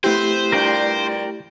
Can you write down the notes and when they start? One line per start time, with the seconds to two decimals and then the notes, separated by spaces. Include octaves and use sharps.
0.04 A3 B3 C4 E4 G4 C5
0.52 G2 F4 A#4 D5 G5